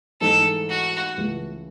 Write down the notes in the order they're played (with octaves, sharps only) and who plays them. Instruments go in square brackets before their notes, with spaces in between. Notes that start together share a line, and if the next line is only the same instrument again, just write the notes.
[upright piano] G#2 E3 A3 D#4 [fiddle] A4
[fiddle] F#4
[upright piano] C#2 C#3 E3 A3